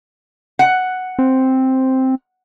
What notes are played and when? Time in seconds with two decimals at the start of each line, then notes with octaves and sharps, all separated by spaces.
0.59 F#5
1.19 C4